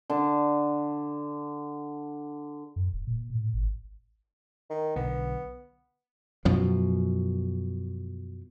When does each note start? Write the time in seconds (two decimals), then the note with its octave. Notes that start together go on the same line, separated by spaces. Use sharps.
0.10 D3 A5
2.76 F#2
2.93 D#1
3.07 A#2
3.35 A2
3.54 G#1
4.70 D#3
4.96 B1 D3 B3
6.45 F#2 B2 F3